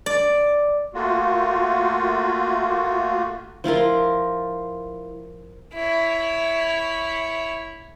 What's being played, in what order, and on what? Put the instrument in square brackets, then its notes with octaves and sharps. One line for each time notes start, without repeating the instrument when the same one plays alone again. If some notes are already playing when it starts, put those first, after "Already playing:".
[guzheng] D5
[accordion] A3 A#3 F4 F#4
[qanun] F3 E4 F4 A#4
[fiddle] E4 C#5